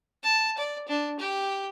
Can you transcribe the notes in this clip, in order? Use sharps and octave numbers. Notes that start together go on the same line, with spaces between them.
A5
D5
D4
G4